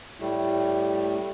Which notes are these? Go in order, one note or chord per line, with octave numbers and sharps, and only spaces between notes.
A2 G3 A3